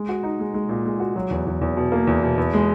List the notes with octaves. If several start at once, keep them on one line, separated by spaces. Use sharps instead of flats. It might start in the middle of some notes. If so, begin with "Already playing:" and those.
Already playing: G#3
F#4
D#4
G#3
G#3
A#2
G#3
F#4
F#3
E2
E2
E2
B2
A#3
E2
B2
E2
G#3